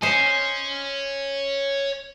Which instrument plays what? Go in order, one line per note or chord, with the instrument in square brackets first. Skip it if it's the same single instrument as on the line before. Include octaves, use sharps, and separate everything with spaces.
[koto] C5 D#5 [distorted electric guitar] C#5 G#5